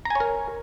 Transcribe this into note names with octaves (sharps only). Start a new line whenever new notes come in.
A#4 C#5 G#5 A#5